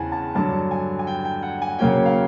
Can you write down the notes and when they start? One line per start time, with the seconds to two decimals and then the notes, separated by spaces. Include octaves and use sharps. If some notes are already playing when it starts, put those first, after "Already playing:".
Already playing: E2 C#3 E3 C4 F#5 G#5 A5
0.12 A5
0.35 G2 D3 F#3 A5
0.71 G#5
0.99 G#5
1.07 G5
1.25 G5
1.43 F#5
1.62 G#5
1.79 C#3 F#3 A#3 C#4 G5
2.06 F5